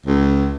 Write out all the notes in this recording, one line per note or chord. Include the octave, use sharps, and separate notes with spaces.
C#2